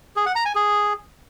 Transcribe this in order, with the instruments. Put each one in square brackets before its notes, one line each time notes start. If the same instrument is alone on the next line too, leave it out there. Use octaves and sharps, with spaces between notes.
[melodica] G#4
F#5
A#5
G#5
G#4